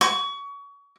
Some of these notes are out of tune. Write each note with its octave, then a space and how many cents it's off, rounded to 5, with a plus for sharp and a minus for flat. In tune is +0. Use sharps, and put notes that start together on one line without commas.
C#6 +30